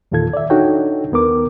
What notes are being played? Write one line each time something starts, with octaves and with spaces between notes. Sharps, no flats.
E2 A#2 D#3 F4 A4 G#6
D5 E5
D4 D#4 F#4 A4 C#5 G5
D#2 B3 A#4 D6